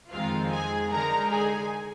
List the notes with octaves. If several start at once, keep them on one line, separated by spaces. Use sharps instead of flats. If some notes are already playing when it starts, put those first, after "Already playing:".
F2 D#3 G#3 C4 D#4 F4 F5
G#4 G#5
D3 G#3 D#4 A#4 A#5
G#4 G#5